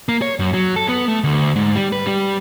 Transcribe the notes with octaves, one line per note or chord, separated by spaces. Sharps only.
A#3
C#5
F#2
F#3
A4
B3
A3
D2
G#2
G3
B4
G3